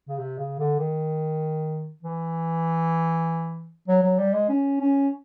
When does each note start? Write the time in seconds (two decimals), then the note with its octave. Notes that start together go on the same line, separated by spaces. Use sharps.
0.08 C#3
0.18 C3
0.38 C#3
0.59 D3
0.79 D#3
2.03 E3
3.88 F#3
4.03 F#3
4.18 G3
4.33 G#3
4.49 C#4
4.80 C#4